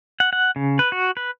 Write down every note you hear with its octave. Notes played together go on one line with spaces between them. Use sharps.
F#5
F#5
C#3
B4
F#4
B4